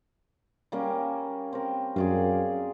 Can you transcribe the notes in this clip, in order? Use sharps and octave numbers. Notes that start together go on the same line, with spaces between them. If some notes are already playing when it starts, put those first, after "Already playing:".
G3 A#3 C#4
C4 A#4
F#2 G#4 D5 F5